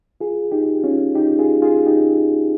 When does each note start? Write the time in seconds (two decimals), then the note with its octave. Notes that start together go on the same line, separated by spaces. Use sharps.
0.21 F4 G#4
0.52 D#4 G4
0.84 C#4 F4
1.15 D#4 G4
1.39 F4 G#4
1.62 F4 G#4
1.86 D#4 G4